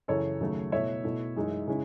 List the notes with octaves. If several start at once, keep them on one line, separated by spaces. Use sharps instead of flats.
F#2 C#3 E3 A4 C#5
D#2 C#3 F#3 A3
B2 A3 E4 C#5 E5
B2 A3 E4
F#2 E3 G#3 D#4
C#3 G#3 C#4 E4